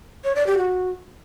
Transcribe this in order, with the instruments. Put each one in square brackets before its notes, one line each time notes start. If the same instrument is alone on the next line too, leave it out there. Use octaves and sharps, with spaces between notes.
[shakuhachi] C#5
D5
G4
F#4